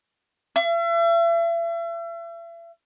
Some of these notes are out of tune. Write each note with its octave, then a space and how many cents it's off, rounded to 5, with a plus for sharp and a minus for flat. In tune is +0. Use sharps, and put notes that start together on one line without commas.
E5 +40